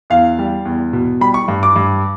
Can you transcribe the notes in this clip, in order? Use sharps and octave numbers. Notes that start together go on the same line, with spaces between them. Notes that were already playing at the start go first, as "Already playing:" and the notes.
E2 F5
G3
E2
B2
G3 B5
C#6
G2
D6
G2